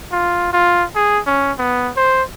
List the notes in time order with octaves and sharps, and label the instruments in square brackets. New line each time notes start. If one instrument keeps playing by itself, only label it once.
[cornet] F4
F4
G#4
C#4
B3
C5